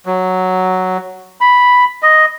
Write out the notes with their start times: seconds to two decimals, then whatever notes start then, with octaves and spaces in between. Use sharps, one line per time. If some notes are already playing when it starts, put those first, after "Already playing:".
0.06 F#3
1.41 B5
2.03 D#5